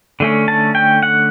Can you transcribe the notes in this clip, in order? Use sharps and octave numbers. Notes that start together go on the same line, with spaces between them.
D3 A3 C#4
A5
G5
F#5